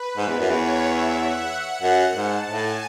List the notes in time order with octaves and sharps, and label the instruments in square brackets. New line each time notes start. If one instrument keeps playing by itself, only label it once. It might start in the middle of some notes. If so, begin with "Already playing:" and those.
Already playing: [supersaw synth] B4
[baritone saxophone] G#2
E2
F#2
[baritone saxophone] E2 [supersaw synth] C#5
[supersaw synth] E5
F#5
[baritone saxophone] F#2
[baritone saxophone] G#2 [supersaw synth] A5
[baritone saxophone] A2 [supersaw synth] G#5